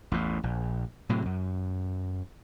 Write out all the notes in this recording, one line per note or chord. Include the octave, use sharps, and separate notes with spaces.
A1 E2 A2
A#1
A2 C3 F#3
F#2